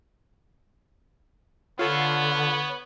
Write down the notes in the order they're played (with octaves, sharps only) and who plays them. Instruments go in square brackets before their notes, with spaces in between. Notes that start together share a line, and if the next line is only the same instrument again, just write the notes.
[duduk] D3 [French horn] B3 [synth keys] F4 A4 [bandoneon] C#5